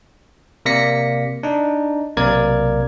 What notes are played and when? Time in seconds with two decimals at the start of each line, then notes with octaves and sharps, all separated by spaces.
0.65 C3 A#3 D5 A#6 B6 C#7
1.43 D4 D#4
2.17 B1 C3 A#3 A#4 D5 G#6